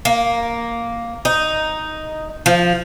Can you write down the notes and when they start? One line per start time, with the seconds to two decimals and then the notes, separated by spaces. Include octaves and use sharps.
0.05 A#3
1.25 D#4
2.46 F3